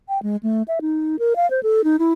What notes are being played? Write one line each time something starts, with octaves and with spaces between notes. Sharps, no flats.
G5
G#3
A3
E5
D#4
A#4
F5
C5
A4
D#4
E4